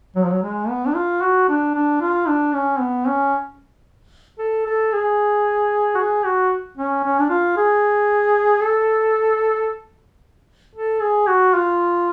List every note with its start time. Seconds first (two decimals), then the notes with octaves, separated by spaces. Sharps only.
0.16 F#3
0.24 F3
0.32 F#3
0.43 G#3
0.69 B3
0.87 D4
0.95 F4
1.22 F#4
1.49 D4
1.75 D4
2.01 F4
2.28 D4
2.54 C#4
2.80 B3
3.08 C#4
4.39 A4
4.67 A4
4.93 G#4
5.95 F#4
5.98 G#4
6.25 F#4
6.77 C#4
7.04 C#4
7.20 D4
7.30 F4
7.57 G#4
8.62 A4
10.75 A4
11.01 G#4
11.28 F#4
11.55 F4